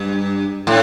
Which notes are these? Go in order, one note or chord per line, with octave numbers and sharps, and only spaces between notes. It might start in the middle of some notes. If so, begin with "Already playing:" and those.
Already playing: G2
A2